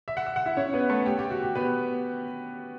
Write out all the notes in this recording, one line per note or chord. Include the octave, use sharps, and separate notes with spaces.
E5
F#5
E5
F#5
E4 E5
C#4 C#5
B3 B4
A3 A4
G4
G4
F#4
G4
B3 B4